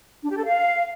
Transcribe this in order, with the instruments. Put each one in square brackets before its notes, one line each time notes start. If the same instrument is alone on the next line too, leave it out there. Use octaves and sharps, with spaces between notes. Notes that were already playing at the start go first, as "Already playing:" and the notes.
[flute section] D4
G4
A4
F5